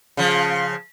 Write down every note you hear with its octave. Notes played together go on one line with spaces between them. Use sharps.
C#3 F3